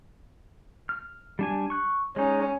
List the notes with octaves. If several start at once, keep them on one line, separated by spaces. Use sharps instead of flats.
F6
G3 D4 G#5
C#6 F#6
G#3 C#4 D#4